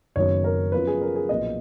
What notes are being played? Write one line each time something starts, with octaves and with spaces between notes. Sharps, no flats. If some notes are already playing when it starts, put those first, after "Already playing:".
F#1 F#2 D#3 F#3 B3 C#5
A#4
F#2 F3 B3 B4
G#4
A#4
G#4
B1 A#2 F3 B3 D#5